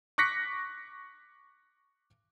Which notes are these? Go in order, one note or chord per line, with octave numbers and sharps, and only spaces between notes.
C#6 D6 F#6 A#6 B6 C#7